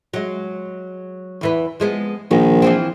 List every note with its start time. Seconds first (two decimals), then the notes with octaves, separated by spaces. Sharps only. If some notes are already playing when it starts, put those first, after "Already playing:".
0.14 F#3 G#3
1.41 E2 E3 B4
1.80 F3 G#3 B3
2.31 A#1 D#3
2.62 E3 F3 C4